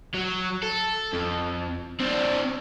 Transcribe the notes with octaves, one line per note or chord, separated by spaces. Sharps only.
F#3
A4
F2
C4 D4